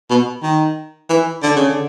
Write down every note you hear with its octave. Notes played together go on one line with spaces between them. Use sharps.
B2
D#3
E3
D3
C#3
D3